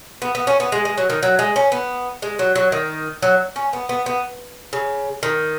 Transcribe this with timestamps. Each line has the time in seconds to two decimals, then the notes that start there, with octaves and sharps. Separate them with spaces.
0.22 B3
0.35 B3
0.47 C#4
0.60 B3
0.72 G#3
0.85 G#3
0.98 F#3
1.10 D#3
1.23 F#3
1.39 G#3
1.56 C#4
1.72 B3
2.22 G#3
2.39 F#3
2.56 F#3
2.72 D#3
3.22 F#3
3.56 C#4
3.73 B3
3.89 B3
4.06 B3
4.73 C#3
5.23 D#3